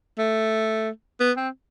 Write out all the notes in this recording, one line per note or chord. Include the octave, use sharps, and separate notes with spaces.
A3
B3
C4